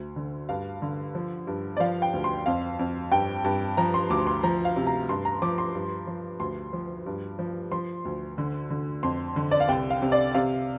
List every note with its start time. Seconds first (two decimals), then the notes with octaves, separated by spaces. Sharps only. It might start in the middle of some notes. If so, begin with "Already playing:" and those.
Already playing: D2
0.16 D3
0.49 G2 F5
0.82 D3
1.15 F3
1.47 G2
1.77 D5
1.80 F3 F5
2.02 G5
2.14 D2
2.24 C6
2.46 F2 F5
2.79 F2
3.12 G2 G5
3.44 G2
3.77 F3 A#5
3.94 C6
4.10 D2 D6
4.27 C6
4.43 F3 A#5
4.65 F5
4.76 C3
4.87 A#5
5.09 G2 C6
5.25 A#5
5.42 F3 D6
5.58 C6
5.75 G2
6.07 F3
6.40 D2 C6
6.73 F3
7.06 G2
7.39 F3
7.72 F3 C6
8.05 D2
8.38 D3
8.70 D3
9.03 F2 C6
9.36 D3
9.51 D5
9.60 F5
9.69 C2 G5
9.90 F5
10.02 C3
10.12 D5
10.34 C3 F5